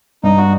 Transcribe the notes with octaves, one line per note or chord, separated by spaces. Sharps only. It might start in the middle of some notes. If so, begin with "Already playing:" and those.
G2 D#4
F#4